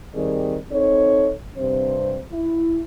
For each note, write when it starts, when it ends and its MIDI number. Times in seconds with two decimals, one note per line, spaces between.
0.15 0.56 51
0.15 0.56 55
0.15 0.56 60
0.15 0.56 68
0.15 0.56 74
0.71 1.33 60
0.71 1.33 63
0.71 1.33 69
0.71 1.33 73
1.57 2.19 43
1.57 2.19 48
1.57 2.19 60
1.57 2.19 72
2.31 2.80 64